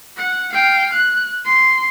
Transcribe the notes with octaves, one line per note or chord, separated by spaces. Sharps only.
F#5
F5 G5
F#6
C6